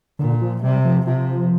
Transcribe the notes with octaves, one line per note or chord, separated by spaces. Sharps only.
A#2 D3
F3
C3 G3
F3
C3 F3